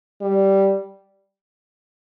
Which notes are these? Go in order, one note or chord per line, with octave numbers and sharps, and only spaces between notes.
G3